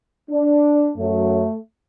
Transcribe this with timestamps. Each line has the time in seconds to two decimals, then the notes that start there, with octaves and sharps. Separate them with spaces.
0.30 D4
0.97 F#2 F#3 A3